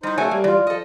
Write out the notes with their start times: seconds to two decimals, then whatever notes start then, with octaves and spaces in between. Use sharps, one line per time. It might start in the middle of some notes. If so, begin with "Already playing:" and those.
0.03 G3 D#4 E4 C5
0.18 C#3 F#3 A3 A4 C#5 G#5
0.31 G3 A#3
0.44 E3 F4 D5
0.67 F3 A4 D#5